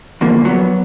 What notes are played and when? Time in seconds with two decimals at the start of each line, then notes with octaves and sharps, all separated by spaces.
0.21 E2 B2 D3 F3 A#3
0.45 F#3 B3